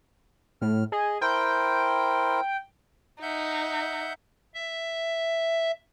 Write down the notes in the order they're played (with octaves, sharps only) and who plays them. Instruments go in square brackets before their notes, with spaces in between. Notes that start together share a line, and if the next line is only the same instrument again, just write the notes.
[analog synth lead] A2 [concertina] F6
[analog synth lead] G#4 [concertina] D#5
[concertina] E4 A#4 C5 [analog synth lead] G5
[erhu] D#4 [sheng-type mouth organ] E5 F#5 G6
[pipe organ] E5